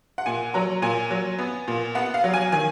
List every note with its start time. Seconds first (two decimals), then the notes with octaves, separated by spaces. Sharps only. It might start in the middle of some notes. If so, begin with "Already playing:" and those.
0.18 F#5
0.26 A#2 G#5
0.54 F#3 A#5
0.82 A#2 G#5
1.11 F#3
1.39 B3
1.68 A#2
1.95 B3 F#5
2.14 F5
2.24 F#3
2.34 G#5
2.52 D#3 G#5